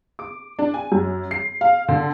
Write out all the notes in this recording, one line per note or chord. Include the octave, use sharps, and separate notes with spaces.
D6
D4
G#5
F#2
C7
F5
D3